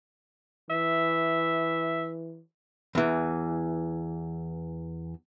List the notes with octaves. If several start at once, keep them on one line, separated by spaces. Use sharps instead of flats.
E3 E5
E2 E3